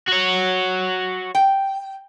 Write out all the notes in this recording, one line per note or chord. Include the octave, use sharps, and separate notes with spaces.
F#4 C#5
G5